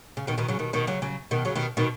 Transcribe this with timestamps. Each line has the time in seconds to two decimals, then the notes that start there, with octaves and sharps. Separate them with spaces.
0.17 C#3
0.27 B2 D#3
0.38 B2 D#3
0.48 C#3 F#3
0.59 B2 D#3
0.73 B2 D#3
0.87 C#3 F#3
1.02 C#3 F#3
1.31 B2 D#3
1.45 C#3 F#3
1.55 B2 D#3
1.77 B2 D#3